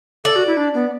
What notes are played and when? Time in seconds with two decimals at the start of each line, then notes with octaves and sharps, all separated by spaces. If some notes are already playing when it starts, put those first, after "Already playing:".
0.25 A4 D5
0.36 F#4
0.47 E4
0.57 D4
0.74 B3